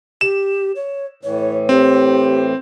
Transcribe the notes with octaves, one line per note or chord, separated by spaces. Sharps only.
G4 E7
C#5
A2 E3 C#5
C4 G4